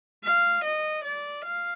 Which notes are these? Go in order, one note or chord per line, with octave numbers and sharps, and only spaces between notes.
F5
D#5
D5
F5